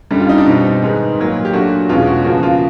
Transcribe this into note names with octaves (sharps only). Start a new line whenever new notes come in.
F#2 D3 G3
F4
D#4
D4
B2 G3 C4 D#4
G#2 D#3 G#3 B3
A#2 F#3 A#3
G4
A#2 F#3 A3 D4 F#4
E2 B2 G#3 C#4 F4
F#4
E2 C#3 F3 A#3 F#4
F4